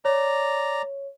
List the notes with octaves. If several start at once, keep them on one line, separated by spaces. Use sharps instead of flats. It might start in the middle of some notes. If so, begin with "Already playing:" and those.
C#5 D5 A#5